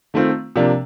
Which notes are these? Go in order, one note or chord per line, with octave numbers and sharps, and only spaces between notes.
D#3 A3 C4 F4
C3 F3 A#3 D4